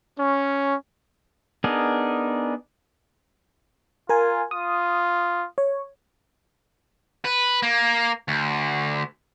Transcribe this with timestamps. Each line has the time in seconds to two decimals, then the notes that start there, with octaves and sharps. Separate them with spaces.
0.17 C#4
1.64 B3 D4 D#4 G#4 A#4
4.09 F4 A#4 G#5
4.51 F4 D#6
5.58 C#5
7.25 B4
7.62 A#3
8.28 D2